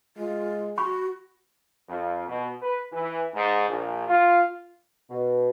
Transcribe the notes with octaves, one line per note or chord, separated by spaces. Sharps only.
G#3 F4
F#4 B5 C#6
F2
B2
B4
E3
G#2
A#1
F4
B2